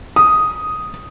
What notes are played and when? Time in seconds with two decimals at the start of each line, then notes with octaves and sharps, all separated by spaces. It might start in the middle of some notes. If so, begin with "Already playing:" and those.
0.16 D#6